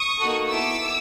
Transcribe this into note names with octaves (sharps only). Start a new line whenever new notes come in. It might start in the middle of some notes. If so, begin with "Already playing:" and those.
Already playing: C#6 D#6
A#3 D#4 F#4 A4
B3 E4 A4 D6 E6